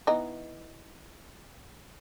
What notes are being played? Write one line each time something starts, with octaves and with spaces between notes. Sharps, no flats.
E3 B3 D#4